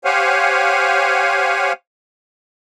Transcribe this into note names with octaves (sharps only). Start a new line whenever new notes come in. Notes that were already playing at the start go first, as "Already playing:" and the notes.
G4 C5 C#5 F5 F#5 G#5